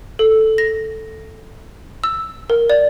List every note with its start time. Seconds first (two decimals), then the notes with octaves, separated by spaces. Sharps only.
0.19 A4
0.58 A#6
2.04 E6
2.50 A#4
2.70 D5